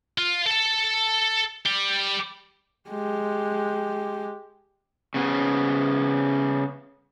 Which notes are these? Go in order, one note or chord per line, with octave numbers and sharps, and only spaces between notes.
F4
A4 A5
G3 G4
G#3 G4
C#3 B3